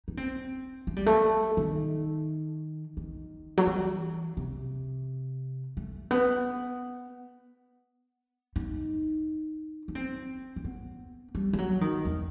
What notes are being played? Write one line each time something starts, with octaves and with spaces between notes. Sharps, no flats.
D#4
C4
A3
G3
A3
D#3
D#3
F#3
E3
C3
A3
B3
D#4
D#4
C4
C4
B3
G3
G3
F#3
D#3
E2